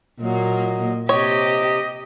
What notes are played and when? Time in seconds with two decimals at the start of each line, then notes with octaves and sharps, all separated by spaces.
0.21 A#2 F#3 A#3 D#5
1.09 C3 G4 C#5 D#5